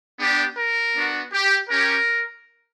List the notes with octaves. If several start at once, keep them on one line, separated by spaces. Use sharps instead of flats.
B3 D4 G4
A#4
B3 D4 F#4
G4
C#4 G4 A#4